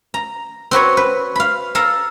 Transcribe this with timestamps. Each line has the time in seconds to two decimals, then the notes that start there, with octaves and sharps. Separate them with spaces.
0.14 A#5
0.71 C4 F#4 B4 C#5
0.97 B4
1.36 F5 B5
1.75 A4 F5 A5 A#5